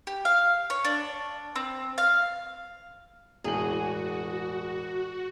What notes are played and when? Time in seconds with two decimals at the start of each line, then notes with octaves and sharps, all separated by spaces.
0.07 G4
0.25 F5
0.70 C#5
0.85 D4
1.56 C4
1.98 F5
3.44 E1 A2 F#4 G#4 F#7